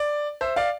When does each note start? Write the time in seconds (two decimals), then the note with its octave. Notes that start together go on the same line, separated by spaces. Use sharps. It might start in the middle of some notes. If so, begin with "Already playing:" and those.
Already playing: D5
0.41 C5 E5
0.56 D5 F5